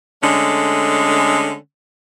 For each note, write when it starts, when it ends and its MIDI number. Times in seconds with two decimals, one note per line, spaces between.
0.23 1.55 50
0.23 1.55 56
0.23 1.55 57
0.23 1.55 61